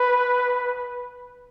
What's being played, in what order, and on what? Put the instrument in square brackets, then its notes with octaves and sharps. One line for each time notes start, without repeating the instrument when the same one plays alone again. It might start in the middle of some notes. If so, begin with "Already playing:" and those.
Already playing: [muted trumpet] B4